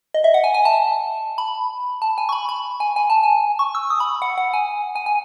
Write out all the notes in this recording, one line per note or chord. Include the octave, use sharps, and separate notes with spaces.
D#5
E5
F#5
G#5
G#5
A5
B5
A5
G#5
C#6
B5
B5
G#5
G#5
A5
G#5
C#6
E6
D#6
B5
F#5
F#5
G#5
G#5
G#5